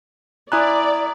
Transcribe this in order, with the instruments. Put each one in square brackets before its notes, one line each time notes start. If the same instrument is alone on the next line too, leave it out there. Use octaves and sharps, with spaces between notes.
[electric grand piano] E4 G#5 F#6 [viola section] D5 [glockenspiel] A#5 D#6